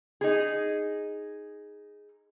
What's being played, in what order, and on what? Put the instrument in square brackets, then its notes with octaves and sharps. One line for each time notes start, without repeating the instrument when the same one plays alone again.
[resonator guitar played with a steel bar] D#4 G#4